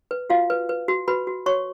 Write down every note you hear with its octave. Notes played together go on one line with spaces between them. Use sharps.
B4
F4 F#4 F5
B4
B4
F#4
F#4 B4 B5
F#4
F#4 C#5 C#6